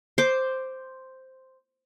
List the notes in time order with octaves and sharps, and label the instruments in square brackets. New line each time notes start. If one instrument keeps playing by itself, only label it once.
[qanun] C5 D6